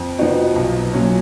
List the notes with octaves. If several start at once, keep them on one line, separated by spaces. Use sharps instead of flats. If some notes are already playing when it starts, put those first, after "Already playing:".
Already playing: F2
F3 B3 D#4 F#4
B1
A#2 F#3 C#4